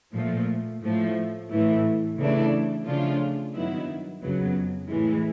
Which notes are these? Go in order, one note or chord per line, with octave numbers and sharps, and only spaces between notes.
A#2 F3 A3
A2 F3 A3
A2 E3 A3
C#3 E3 A3 D4
C#3 F3 A3 D4 F4
G2 D#3 F#3 B3 E4
F2 C#3 F#3 B3
A2 E3 G#3